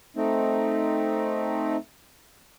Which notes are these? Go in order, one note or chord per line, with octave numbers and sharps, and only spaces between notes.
A3 C4 D#4